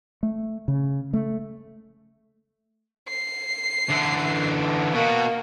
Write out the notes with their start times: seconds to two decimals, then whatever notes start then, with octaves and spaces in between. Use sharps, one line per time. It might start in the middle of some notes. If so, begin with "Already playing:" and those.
0.23 A3
0.68 C#3
1.13 A3
3.09 C7
3.90 D3 E3
4.93 B2 A#3 F#4